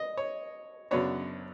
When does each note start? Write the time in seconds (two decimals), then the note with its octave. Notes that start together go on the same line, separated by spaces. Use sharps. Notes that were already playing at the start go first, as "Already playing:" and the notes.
Already playing: D#5
0.17 C#5
0.91 F#2 C#3 F#3 B3 D4 C#5